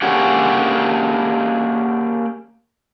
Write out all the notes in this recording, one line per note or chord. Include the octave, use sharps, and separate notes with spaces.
A#3 C#4 D4 G4 G#4 F#5